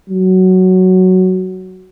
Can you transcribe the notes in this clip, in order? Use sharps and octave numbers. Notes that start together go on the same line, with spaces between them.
F#3